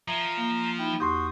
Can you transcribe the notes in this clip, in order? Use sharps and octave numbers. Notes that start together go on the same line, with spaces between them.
F3 E5 A#5 G#6
A#3 F5
D#4 E4 G5
E2 F#4 G4 C6 D#6 G6